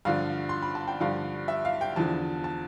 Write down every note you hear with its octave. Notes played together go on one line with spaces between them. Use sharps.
G2 D3 F3 F5
C6
B5
A5
G5
G2 D3 F3 F5
E5
F5
G5
E2 D3 F3 A5
A5